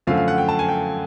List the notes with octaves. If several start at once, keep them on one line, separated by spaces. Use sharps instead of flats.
F#2 D3 F3 A3 F5
F5
F#5
G5
A5
G#5
G5